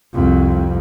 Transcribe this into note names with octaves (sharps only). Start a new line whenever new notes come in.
C2 F2